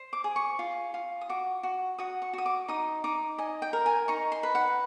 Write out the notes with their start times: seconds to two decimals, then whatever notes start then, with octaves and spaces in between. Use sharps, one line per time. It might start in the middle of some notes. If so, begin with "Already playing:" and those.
Already playing: C5
0.13 D6
0.24 G#4
0.36 C#6
0.59 F4
0.94 F4
1.21 D#6
1.29 F#4 D6
1.63 F#4
1.98 F#4 D#6
2.22 C#6
2.33 F#4 D#6
2.46 D6
2.68 D#4 D#6
3.04 D#4 D6
3.38 D#5 G#5
3.62 G5
3.73 A#4
3.86 G#5
4.08 D#4 C#6
4.32 C6
4.43 B4
4.55 F#5